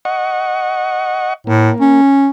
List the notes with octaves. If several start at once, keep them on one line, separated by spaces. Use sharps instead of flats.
D#5 F#5 C#6
A2 A#3
C#4